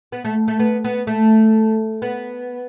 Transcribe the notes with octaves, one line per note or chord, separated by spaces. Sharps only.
B3
A3
A3
B3
B3
A3
B3